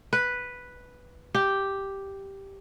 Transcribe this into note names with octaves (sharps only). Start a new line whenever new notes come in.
B4
G4